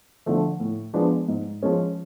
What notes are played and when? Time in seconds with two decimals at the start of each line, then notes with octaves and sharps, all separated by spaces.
0.26 D3 F3 A3
0.60 A2
0.94 F3 G#3 B3 D4
1.28 G#2
1.63 F3 G#3 C#4